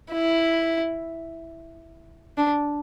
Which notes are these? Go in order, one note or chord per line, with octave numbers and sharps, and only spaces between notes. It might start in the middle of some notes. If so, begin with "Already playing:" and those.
E4
D4